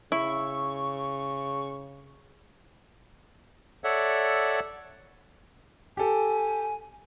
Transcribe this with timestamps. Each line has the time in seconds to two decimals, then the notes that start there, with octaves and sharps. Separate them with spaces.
0.12 C#3 E4 C#6
3.84 A4 C#5 D5 E5 F#5
5.97 G4 A4 G#5